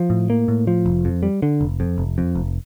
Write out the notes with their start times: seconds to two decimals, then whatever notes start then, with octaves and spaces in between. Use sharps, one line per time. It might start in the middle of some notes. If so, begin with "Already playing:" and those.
Already playing: F3
0.10 A2
0.30 A#3
0.48 A2
0.67 F3
0.86 F1
1.05 F2
1.23 G3
1.42 D3
1.61 F1
1.80 F2
1.98 F1
2.18 F2
2.35 F1